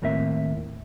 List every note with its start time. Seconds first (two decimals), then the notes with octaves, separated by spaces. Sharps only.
0.02 D#2 A2 A#3 C4 E5